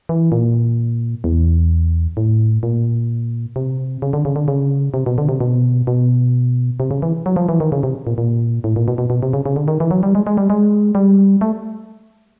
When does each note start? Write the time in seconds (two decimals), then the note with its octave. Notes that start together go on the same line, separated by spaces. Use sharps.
0.09 E3
0.32 A#2
1.24 E2
2.17 A2
2.63 A#2
3.56 C3
4.02 C#3
4.13 D3
4.25 C#3
4.36 D3
4.48 C#3
4.94 C3
5.06 B2
5.18 D3
5.29 C3
5.40 B2
5.87 B2
6.80 C3
6.91 C#3
7.02 E3
7.26 F#3
7.36 F3
7.49 E3
7.60 D#3
7.72 C#3
7.83 C3
8.07 A#2
8.18 A#2
8.64 A2
8.76 A#2
8.88 B2
8.98 B2
9.10 B2
9.23 C3
9.33 C#3
9.46 C#3
9.56 D3
9.68 D#3
9.80 E3
9.91 F#3
10.03 G3
10.15 G#3
10.27 G#3
10.37 G3
10.50 G#3
10.95 G3
11.41 A3